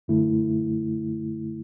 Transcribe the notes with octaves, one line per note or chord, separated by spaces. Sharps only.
F#2 D3 A3 E4